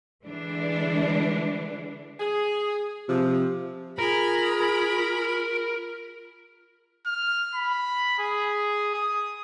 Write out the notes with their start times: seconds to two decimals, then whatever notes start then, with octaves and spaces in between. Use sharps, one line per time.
0.24 D3 E3 G#3 D4
2.20 G#4
3.09 C3 F3
3.99 F4 G#4 A#4 B5
7.06 F6
7.55 B5
8.19 G#4
8.95 D#6